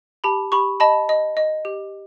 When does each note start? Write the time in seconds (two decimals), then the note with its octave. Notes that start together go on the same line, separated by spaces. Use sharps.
0.24 G4 A5 B5
0.52 G4 B5 C#6
0.80 D#5 A5 B5
1.09 D#5
1.37 D#5
1.65 G4